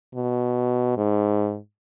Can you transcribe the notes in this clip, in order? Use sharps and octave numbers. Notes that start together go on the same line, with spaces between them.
B2
G#2